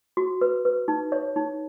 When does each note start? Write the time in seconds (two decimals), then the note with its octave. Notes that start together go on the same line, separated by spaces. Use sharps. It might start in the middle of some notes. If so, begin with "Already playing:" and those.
0.17 F#4
0.41 B4
0.65 B4
0.88 D#4
1.12 C#5
1.36 D#4